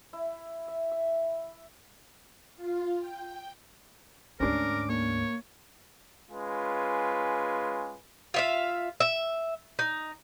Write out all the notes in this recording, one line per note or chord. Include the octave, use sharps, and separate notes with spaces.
E4
E5
E5
F4
G5
D2 G#2 C#4 D4 A#4 D6
A#3 C#5
G#3 C#4 F4 B4 G#5
F4 E5 F5
E5
D#4